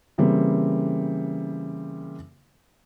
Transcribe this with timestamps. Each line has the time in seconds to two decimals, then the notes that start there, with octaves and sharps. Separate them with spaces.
0.18 C#3 E3 G3 A#3 C4